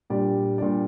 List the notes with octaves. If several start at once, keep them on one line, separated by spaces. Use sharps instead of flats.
A#2 G3 D4 G4 D5
A#2 G3 D4 G4 D5